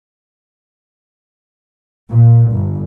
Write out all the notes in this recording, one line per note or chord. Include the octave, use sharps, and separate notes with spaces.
A#2
G1